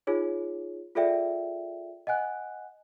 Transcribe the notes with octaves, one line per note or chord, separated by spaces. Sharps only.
D#4 F4 G#4 C#5
F4 G#4 A4 D5 E5 G5
D#5 F#5 G#5 F#6